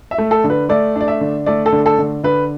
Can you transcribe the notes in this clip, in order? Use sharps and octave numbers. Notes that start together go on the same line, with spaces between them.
E5
A3
A4
D3
B4
A3 D5
D4
D5
E5
D3
A3 D5
A4
D3
A4
D3
D3 B4